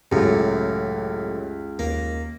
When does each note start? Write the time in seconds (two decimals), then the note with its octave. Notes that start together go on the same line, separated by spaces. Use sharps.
0.12 C#2 F#2 A2 G4
1.79 D#2 A#3